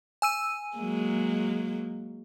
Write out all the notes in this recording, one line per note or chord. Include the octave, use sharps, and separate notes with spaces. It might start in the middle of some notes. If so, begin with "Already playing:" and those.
G#5 E6 D#7
F#3 G#3 A#3